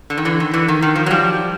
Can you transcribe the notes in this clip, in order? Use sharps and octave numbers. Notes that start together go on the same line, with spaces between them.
D3
D#3
D3 E3
D#3
D3 E3
D#3
D#3
D#3 F3
F#3
F3 G3